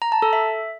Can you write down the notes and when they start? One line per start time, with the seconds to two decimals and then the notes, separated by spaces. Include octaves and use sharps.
0.02 A#5
0.12 A5
0.22 A4
0.33 E5